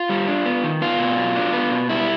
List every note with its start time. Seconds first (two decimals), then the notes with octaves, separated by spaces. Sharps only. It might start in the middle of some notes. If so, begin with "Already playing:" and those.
Already playing: F4
0.09 G3
0.28 D4
0.46 B3
0.64 D#3
0.82 B3 F4
0.99 B2
1.18 F#3
1.36 D4
1.53 B3
1.71 B2
1.89 G3 E4